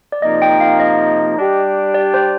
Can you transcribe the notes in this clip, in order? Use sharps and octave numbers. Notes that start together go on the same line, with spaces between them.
D5
C3 F3 A#3 D#4 D#5
G5
F5
D#5
G3 D4 G4
D5
C5